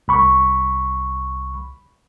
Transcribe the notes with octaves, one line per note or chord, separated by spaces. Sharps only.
C2 B5 C#6